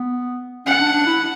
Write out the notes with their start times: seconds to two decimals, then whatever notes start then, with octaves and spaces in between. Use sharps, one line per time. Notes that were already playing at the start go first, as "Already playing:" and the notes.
Already playing: B3
0.66 C#4 F#5
0.80 D4
0.93 D4
1.06 E4